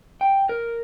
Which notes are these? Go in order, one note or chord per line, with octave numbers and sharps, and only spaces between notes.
G5
A#4